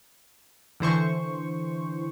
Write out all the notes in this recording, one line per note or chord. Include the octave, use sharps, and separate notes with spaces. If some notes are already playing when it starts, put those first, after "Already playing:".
D3 E3 C5 C#6